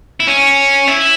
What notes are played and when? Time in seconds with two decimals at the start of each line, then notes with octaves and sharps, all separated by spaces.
0.20 E4
0.27 C#4
0.87 E4